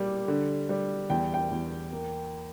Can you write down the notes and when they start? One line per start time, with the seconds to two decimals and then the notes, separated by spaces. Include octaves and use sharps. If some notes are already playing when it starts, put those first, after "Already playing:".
Already playing: A#2 G3
0.28 D3
0.69 G3
1.10 E2 G5
1.34 G5
1.51 E2
1.92 A#3